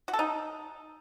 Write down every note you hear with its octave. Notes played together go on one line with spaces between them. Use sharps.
F#4
A4
D#4